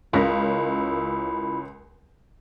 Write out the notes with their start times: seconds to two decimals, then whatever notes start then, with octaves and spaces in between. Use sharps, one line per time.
0.13 C#2 C#4 E4 F4 A#4 D#5